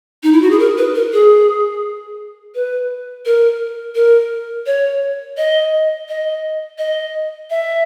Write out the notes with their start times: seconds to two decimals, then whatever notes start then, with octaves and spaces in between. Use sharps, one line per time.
0.23 D#4
0.32 E4
0.42 F#4
0.51 G#4
0.59 A#4
0.78 B4
0.95 A#4
1.13 G#4
2.55 B4
3.26 A#4
3.95 A#4
4.66 C#5
5.37 D#5
6.09 D#5
6.78 D#5
7.50 E5